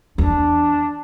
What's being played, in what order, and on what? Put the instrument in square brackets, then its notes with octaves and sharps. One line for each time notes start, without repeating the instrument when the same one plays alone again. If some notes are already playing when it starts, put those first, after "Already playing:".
[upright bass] E2 [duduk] D4